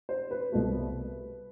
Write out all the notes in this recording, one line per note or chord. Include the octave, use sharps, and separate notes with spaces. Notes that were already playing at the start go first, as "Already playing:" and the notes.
C5
B4
C2 B2 A3